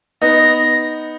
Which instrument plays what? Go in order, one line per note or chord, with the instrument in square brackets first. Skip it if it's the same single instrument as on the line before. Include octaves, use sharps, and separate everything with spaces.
[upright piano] B3 D#4 [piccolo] A#6